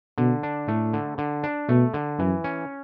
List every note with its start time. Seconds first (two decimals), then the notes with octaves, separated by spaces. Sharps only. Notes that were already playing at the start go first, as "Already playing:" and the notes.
0.18 B2 D3
0.43 D4
0.68 A2 A3
0.93 D3
1.18 D3
1.44 D4
1.69 B2 A3
1.94 D3
2.19 F#2 E3
2.44 C#4